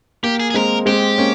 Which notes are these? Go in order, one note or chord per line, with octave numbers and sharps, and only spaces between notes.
A#3 G4
G#4
G#4
G#3 C4 A#4
G#3 C4 G4
A#3 C#4